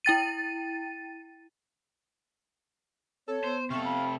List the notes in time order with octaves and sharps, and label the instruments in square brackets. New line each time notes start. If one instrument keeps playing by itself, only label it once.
[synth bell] E4 G5 A6 D#7
[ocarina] C4 [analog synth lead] A4 [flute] C#5
[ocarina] B3 [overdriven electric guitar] C5
[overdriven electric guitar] C3 A4 [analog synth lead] F5 [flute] C#6
[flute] B5